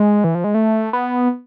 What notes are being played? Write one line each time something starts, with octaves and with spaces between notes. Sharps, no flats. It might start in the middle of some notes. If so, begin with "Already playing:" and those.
Already playing: G#3
E3
F3
G#3
A3
B3